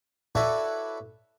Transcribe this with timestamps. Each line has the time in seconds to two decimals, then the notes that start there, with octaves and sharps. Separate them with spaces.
0.35 E4 F#4 A4 B4 C#5 D5